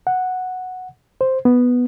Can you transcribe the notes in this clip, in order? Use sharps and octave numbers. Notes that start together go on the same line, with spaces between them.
F#5
C5
B3